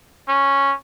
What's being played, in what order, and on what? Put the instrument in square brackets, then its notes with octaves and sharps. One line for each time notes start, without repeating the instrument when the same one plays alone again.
[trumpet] C#4